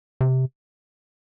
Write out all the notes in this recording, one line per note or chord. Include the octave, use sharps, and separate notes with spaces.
C3